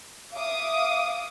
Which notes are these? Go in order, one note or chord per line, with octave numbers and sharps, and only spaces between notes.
E5 F5 D6 D#6